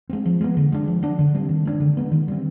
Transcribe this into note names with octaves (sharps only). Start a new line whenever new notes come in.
G#3 C4
F3
G#3 B3
D3
G#3 D4
F3
B3 D4
D3
G3 C4
D#3
G#3 B3 D4
D3
G#3 B3
D#3
G3 C4